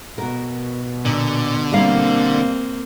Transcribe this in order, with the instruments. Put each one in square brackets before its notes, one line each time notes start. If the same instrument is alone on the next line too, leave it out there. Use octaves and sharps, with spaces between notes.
[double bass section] B2 [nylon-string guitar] F#4 A#4
[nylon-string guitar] A#2 [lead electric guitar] D3
[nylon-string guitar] G3 A#4 F5 [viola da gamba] A#3 C4